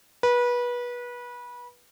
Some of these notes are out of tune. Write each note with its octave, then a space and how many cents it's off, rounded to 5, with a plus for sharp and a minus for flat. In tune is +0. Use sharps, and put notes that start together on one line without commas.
B4 -25